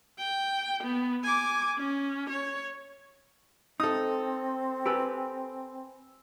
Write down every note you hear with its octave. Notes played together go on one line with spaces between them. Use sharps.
G5
B3
G#5 D6
C#4
C#5
C4 D#4 A4 D#6
G4 B4 G#5 B5 E6